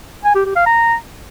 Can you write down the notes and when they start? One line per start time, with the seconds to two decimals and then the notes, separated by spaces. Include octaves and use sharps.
0.24 G#5
0.35 G4
0.45 G4
0.56 F5
0.66 A#5